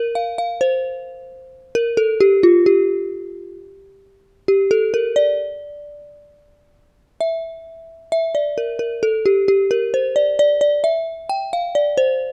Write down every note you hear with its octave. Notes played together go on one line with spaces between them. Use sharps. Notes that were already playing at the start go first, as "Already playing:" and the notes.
Already playing: A#4
F5
F5
C5
A#4
A4
G4
F4
G4
G4
A4
A#4
D5
E5
E5
D5
A#4
A#4
A4
G4
G4
A#4
C5
D5
D5
D5
E5
G5
F5
D5
C5